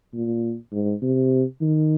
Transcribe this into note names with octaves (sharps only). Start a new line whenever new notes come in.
A#2
G#2
C3
D#3